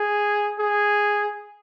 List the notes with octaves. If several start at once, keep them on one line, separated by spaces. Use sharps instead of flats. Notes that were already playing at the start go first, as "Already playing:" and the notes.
Already playing: G#4
G#4